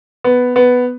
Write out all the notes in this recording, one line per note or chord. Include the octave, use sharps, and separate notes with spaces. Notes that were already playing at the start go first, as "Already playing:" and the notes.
B3
B3